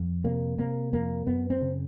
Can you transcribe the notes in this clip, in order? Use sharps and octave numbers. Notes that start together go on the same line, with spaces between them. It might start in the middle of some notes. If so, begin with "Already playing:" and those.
Already playing: F2
C3 A#3
C3 A#3
F2 A#3
F#2 B3
C4
C#3